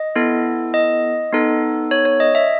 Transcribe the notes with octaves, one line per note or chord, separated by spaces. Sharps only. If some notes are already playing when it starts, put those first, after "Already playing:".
Already playing: D#5
B3 E4 A4
D#5
B3 D#4 A4
C#5
C#5
D#5
E5